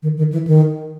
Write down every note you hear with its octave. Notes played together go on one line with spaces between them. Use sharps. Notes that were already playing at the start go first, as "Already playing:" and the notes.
D#3
D#3
E3
D#3